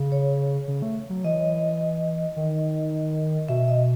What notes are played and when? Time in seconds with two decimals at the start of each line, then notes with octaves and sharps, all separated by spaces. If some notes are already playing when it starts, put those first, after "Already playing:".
Already playing: C#3
0.12 C#5
0.68 C#3
0.82 A3
1.10 F#3
1.24 E3 D#5
2.36 D#3
3.49 B2 E5
3.68 D#5